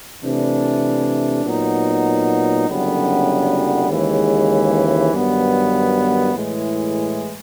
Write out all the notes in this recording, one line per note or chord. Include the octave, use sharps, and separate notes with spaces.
C3 E3 A3 D4
A#2 F#3 B3 D#4
F#1 F#2 D3 G3 B3
D#2 C#3 E3 G#3
G2 D#3 F#3 B3
A2 E3 G#3